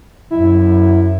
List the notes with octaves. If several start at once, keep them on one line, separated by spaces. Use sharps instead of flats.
F#2 E4